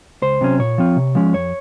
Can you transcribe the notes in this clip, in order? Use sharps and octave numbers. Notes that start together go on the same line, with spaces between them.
C#2 C5
C3 F#3 C#4
A#2 C#5
F3 C4 F4
C3
F3 G#3 C#4
F2 C#5